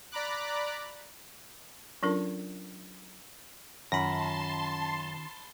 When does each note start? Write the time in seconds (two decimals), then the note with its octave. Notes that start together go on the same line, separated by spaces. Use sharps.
0.12 D5 A#5 B5 D6 F#6
2.03 F#3 C#4 D4 F4 A4 A#4
3.92 F#2 D#3 C#4 F4 A5 B5 C6 A#6